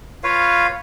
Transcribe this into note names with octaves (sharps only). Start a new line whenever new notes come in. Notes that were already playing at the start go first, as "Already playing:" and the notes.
F4 B4 C#5 F5